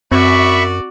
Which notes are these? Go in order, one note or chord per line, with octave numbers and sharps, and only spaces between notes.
F#2 C4 F#4 D5 E5 B5 C#6